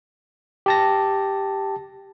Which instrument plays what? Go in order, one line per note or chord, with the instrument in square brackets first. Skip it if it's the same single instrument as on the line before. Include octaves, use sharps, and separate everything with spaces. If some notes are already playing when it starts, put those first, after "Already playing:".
[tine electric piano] G4 A5 A#6